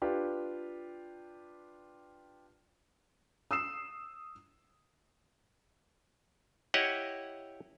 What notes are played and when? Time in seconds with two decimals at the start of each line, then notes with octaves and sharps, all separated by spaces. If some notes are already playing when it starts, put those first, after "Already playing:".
0.02 D4 F4 G4 B4
3.51 D#6 E6 C7 E7
6.74 E4 G4 C#5 D#5 F#5